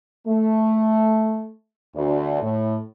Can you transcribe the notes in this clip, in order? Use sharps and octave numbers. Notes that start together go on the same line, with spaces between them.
A3
D2
A2